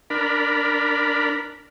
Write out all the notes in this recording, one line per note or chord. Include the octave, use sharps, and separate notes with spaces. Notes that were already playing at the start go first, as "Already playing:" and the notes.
D4 A#4 B5